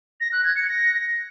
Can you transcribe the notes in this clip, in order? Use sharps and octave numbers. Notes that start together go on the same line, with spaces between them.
A#6
F#6
G#6
C#7
A#6